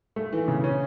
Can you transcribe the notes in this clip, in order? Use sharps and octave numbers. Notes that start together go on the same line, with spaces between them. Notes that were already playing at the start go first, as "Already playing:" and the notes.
A3
E3
C#3
C#4